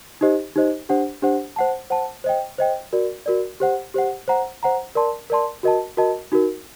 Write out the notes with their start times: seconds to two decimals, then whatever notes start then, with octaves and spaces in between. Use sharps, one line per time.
0.21 D#4 G4 C5 D#5
0.56 D#4 G4 C5 D#5
0.89 D4 G4 C5 F#5
1.22 D4 G4 C5 F#5
1.56 C5 F#5 A5
1.90 C5 F#5 A5
2.24 C5 D#5 G5
2.58 C5 D#5 G5
2.93 F#4 A#4 D5
3.26 F#4 A#4 D5
3.60 G4 C5 F#5
3.94 G4 C5 F#5
4.28 C5 F#5 A#5
4.63 C5 F#5 A#5
4.95 A#4 D5 A5 C6
5.30 A#4 D5 A5 C6
5.63 F#4 A#4 D#5 A5
5.97 F#4 A#4 D#5 A5
6.32 D#4 F#4 A#4